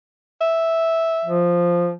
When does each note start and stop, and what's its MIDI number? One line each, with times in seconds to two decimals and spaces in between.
0.41 1.41 76
1.25 1.93 53